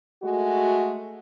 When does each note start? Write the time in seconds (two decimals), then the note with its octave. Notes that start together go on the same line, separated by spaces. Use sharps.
0.23 G#3 A3 F#4